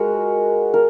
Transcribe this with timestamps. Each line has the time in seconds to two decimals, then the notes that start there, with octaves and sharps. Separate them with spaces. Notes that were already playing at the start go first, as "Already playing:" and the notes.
Already playing: G#3 F#4 A#4
0.74 A#4